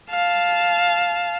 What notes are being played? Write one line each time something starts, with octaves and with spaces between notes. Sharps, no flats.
F5 A5